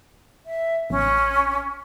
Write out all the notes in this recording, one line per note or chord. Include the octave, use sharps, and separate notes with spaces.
E5
A1 C#4